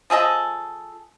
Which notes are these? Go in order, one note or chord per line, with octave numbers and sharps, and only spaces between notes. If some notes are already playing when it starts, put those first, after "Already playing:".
F3 G#4 A4 D#5